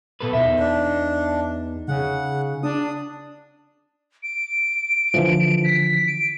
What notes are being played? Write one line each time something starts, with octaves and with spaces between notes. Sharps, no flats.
B2 A4 B4
E2 D#4 E5
D4
C#3 F#5
D4 D#6
D7
D3 E3 F3
B6
D7